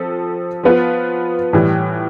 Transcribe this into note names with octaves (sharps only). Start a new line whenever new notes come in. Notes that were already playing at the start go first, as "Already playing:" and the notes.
Already playing: F3 C4 A4
F3 B3 F4 B4
A2 E3 G3